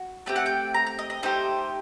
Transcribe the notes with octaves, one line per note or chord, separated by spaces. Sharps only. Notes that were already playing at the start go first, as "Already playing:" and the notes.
Already playing: F#4
A3 C4 G4 G5
F#5
G5
A#5
A#5
D#5
D#5
A3 D#4 G4 C5